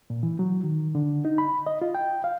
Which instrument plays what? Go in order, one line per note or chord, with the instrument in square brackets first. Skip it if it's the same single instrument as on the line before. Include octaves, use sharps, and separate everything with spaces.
[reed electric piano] A#2
E3
F#3
D#3
D3
D#4
B5
D#5
F4
G5
F5